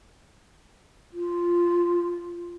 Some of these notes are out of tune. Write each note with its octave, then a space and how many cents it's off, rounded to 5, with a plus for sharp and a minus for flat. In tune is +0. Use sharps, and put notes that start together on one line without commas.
F4 -5